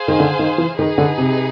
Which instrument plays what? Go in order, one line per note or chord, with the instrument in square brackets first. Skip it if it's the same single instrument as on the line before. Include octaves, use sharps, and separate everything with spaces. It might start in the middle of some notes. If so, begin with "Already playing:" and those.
Already playing: [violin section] G#4 C5 F5 G#5
[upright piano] D#3
D3
D#3
E3
[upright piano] D#3 [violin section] D#4 G#4 B4
[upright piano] D3
C3